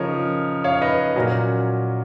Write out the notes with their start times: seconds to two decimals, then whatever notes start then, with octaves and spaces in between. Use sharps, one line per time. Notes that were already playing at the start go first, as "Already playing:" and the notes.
Already playing: C#3 F3 A#4 C#5 D#5
0.64 C#5 F5
0.81 B4 D#5
1.15 A#2 F#3 C#4 F#4 A#4